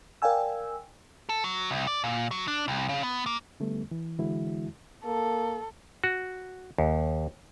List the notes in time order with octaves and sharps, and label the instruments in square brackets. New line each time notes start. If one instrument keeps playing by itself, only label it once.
[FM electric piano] A#4 D5 F5 G5 G#5 E6
[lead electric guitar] A4
F#3
C2
D5
A#2
F#3
D4
C2
C#3
B3
A#3
[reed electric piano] D3 G3 A3 B3
E3
D3 E3 G#3 E4 F#4
[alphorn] A#3 [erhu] A4
[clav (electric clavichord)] F#4
D#2